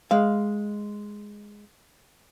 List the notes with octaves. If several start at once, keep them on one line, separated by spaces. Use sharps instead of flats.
G#3 F5